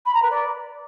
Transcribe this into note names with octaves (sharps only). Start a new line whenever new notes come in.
B5
A#5
B4
D5